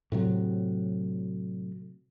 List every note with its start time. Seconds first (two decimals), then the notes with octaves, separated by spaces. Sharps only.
0.12 A2 C3 F#3